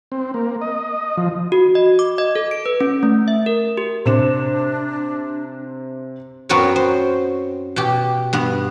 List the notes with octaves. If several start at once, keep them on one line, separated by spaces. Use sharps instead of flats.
C4
A#3
D#5
F3
F#4
D#5
D6
D#5
A4
D7
B4
C#4
A3
E5
A#4
G4
C3 D4 C5 E7
F#2 F#3 B3 C4 A#4 C#5
C5
B2 G4
G2 B3